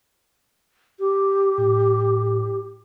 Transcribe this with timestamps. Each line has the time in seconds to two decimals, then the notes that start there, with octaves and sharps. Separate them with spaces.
1.00 G4
1.58 A2